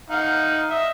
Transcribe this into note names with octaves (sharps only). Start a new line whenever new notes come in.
D#4 F5 F#5
D#5 E5